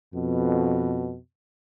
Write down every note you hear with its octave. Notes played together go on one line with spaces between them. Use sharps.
F2 B2